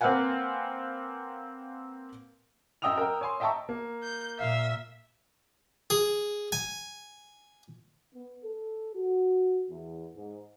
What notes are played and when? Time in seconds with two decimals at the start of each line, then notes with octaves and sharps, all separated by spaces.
0.01 A#3 C4 B4 F5 F#5 G#5
2.82 F#2 D#5 G5 D#6 E6 F7
2.97 A#4 G5
3.21 C#5 G#5 C6
3.40 D#5 E5 G5 A5 A#5 C#6
3.69 A#3
4.03 G6
4.39 A#2 E5 F5
5.90 G#4
6.52 G#5
8.15 B3
8.44 A4
8.96 F#4
9.70 E2
10.16 G#2